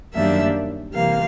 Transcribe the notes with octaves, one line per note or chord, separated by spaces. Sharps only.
F#2 D#3 G3 A#3 D4 E5
C3 E3 G3 A#3 F5